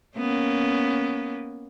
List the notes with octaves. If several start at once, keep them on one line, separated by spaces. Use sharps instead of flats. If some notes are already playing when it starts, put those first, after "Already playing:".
A#3 B3 C#4